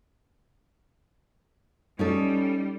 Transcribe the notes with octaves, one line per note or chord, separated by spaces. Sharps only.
G3 C#4 D#4 A4